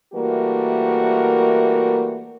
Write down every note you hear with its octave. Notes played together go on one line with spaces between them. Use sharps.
E3 G3 A3 A#3 F#4 A#4